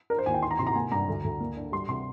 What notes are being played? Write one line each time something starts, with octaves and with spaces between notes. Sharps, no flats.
D4 A#4
C5
D#2 G#5
G5
D#4 C6
A#5
C3 C6
A#5
A#3 G#5
G2 A#5
D2
D2
A#3
D4
G3 C6
C3 C6